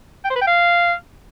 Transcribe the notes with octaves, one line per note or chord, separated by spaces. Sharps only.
G5
C5
B4
G5
F5